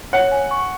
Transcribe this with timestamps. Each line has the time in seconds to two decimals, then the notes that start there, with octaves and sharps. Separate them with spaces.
0.13 C#5 F#5
0.32 G#5
0.51 C#6